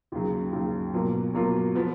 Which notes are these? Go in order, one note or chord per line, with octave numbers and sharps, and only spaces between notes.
D#2 C#3 F#3
D#2 C#3 F#3
B2 F#3 A#3 F4
B2 F#3 A#3 F4
F3 B3